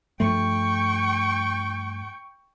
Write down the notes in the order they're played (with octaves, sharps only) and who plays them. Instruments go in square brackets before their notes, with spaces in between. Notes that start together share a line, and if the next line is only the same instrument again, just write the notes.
[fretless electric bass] G2 F3 A3 [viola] G5 C#6